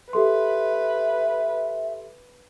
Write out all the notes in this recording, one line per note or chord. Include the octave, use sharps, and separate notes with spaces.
G4 A4 B4 E5 C6